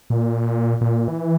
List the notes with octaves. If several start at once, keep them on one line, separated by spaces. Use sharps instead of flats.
A#2
A#2
E3